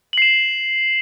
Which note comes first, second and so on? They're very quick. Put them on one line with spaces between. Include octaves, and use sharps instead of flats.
F#7 C7 E7